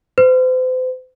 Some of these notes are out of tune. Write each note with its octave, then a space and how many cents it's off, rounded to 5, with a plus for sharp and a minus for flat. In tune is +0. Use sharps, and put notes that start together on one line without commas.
C5 -40